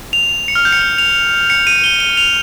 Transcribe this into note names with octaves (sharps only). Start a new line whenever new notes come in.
F7
C#7
F6
G6
C#7
F7
F7
C#7
D#7
G7
D#7
F7